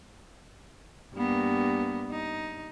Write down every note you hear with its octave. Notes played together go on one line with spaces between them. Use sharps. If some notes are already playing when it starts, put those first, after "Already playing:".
G2 A#3 B3
D#4